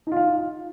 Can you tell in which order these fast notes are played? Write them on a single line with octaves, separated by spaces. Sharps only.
D#4 F4 F5